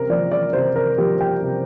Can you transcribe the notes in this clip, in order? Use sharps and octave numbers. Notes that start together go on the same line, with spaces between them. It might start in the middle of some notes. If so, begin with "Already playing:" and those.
Already playing: C3 A#4
F3 A#3 D5
D5
C3 C5
A#4
F3 A#3 G4
G5
C3